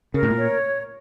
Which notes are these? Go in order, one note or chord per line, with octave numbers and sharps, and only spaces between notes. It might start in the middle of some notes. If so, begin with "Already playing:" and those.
C#3 A#4
A2
A#2
C#5